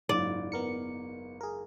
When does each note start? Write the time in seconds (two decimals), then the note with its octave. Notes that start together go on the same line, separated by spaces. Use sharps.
0.09 F#1 G#2 F4 D5
0.52 B3 A#4 C#7
1.41 G#4 A#4